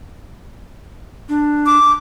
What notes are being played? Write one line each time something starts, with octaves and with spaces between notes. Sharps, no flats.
D4
D6